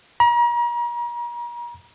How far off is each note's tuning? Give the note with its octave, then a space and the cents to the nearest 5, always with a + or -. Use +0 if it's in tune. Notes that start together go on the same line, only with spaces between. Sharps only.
A#5 +40